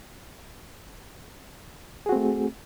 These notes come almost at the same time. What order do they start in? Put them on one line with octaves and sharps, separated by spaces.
G#4 F#4 C4 A3